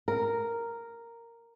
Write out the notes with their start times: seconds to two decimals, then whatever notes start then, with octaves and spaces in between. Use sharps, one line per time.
0.08 A#4